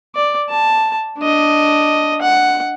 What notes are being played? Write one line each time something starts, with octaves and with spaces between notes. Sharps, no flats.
D5
A5
D4 D#5
F#5